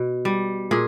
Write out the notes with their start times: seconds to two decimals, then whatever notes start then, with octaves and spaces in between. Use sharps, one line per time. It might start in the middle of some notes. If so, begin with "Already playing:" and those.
Already playing: B2
0.25 G3
0.71 A#2 G#4